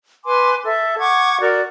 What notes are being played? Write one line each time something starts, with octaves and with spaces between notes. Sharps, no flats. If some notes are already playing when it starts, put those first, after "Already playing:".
B4 G#5 C6 D6
A4 E5
F#5 C#6 D6 G#6
F#4 A#4 D5